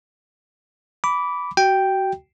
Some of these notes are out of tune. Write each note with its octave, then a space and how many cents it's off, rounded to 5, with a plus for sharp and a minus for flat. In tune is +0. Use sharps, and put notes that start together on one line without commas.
B5 +0 D6 -15
F#4 +30 G5 +0